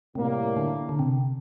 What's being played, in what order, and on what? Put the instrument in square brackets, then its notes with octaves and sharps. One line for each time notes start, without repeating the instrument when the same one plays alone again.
[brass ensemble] A2 G3 A#3 [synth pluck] C3
[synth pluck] D3
D3
C3